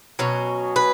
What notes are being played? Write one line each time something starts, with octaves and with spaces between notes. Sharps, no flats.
B2 F#3 C#4
B4